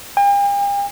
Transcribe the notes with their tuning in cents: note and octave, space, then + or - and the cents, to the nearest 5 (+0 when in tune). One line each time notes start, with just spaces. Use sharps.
G5 +45